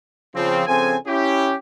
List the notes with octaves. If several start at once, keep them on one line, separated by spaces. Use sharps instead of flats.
C#3 F3 C4
C#3 F3 C4 A4 G#5
C#4 E4 G4